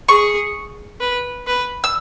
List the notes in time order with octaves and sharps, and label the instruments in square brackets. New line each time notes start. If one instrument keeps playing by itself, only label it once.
[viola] G#4 [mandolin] C#6
[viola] B4
B4
[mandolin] E6